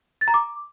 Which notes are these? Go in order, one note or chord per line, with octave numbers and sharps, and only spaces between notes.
A6
A#5
D6